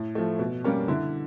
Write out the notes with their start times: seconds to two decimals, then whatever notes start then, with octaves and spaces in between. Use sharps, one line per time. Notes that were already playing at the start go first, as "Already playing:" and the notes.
Already playing: A2
0.15 F3 A3
0.39 B2
0.64 G3 A#3 C#4
0.88 D3 E4